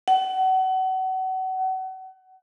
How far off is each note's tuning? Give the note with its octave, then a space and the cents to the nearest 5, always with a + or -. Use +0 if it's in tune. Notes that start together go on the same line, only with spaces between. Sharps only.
F#5 +30